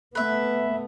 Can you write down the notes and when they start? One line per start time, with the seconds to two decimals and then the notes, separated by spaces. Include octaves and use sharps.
0.15 A3 B3 B4 E5